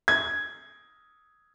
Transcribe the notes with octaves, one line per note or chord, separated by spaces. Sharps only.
G#6